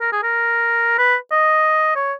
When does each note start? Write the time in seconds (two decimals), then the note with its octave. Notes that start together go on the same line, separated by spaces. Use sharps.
0.01 A#4
0.12 G#4
0.23 A#4
0.98 B4
1.31 D#5
1.96 C#5